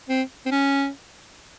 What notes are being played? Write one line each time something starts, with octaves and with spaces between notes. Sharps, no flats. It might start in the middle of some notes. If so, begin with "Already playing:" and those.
C4
C4
C#4